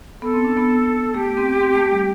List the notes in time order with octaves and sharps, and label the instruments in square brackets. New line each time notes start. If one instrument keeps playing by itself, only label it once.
[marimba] B3 [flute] A4
[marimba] C4
D4
B3
[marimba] A3 [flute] G4
[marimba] C4
C4
A3
G3